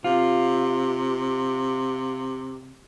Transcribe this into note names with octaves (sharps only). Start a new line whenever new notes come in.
C3 F4